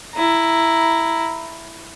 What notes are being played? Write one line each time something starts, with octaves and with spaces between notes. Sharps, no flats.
E4 A#5